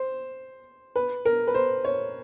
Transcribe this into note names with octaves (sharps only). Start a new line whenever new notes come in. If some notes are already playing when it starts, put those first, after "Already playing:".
Already playing: C5
B4
A#4
B4
C5
C#5